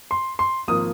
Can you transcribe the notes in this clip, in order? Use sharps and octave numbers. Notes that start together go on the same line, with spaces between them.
C6
C6
G#1 F3 A#3 D#6